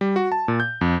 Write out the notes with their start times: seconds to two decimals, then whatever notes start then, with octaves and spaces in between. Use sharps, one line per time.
0.01 G3
0.16 F#4
0.32 A5
0.48 A#2
0.60 G6
0.81 F2